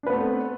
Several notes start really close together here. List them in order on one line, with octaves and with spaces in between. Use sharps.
D4 B4 B3 A3 C4